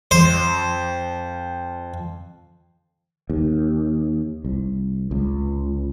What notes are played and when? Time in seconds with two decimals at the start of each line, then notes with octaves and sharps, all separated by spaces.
0.11 F2 C5
3.30 D#2
4.44 C2
5.11 C#2